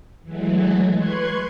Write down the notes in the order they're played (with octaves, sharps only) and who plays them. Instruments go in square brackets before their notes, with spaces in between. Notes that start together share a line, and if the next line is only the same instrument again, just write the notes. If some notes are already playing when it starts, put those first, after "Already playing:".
[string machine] E3 F#3 G#3 A3
B4 C6 C#6 F#6 G#6